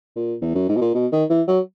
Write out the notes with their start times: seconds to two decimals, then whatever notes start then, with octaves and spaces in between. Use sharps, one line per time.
0.16 A#2
0.41 E2
0.55 F#2
0.69 G#2
0.77 B2
0.81 A#2
0.94 B2
1.12 D#3
1.30 E3
1.47 F#3